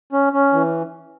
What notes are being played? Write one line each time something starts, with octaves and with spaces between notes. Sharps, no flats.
C#4
C#4
E3